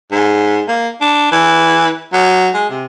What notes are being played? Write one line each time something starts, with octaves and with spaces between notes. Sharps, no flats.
G#2
A#3
D4
E3
F#3
G#3
C3